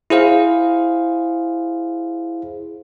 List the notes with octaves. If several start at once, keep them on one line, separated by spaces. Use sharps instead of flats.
E4 G#4 C5 F5